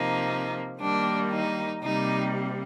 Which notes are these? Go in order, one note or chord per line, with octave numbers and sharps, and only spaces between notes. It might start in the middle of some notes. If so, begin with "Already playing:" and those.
Already playing: C3 F3 A#3 D#4
D#3 G3 A#3 D4
D#4
C3 G3 A#3 D#4